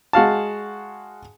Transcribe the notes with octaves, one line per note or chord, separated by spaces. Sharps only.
G#3 F#4 F5 A5